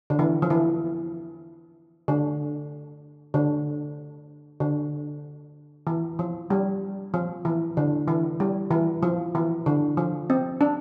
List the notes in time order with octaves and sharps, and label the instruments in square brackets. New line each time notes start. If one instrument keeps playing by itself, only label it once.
[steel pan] D3
E3
F3
E3
D3
D3
D3
E3
F3
G3
F3
E3
D3
E3
G3
E3
F3
E3
D3
F3
C4
D4